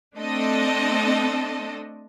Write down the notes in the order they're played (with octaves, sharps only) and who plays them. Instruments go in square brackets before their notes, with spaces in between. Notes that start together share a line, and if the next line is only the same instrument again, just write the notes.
[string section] A3 C4 D4 A4 D#5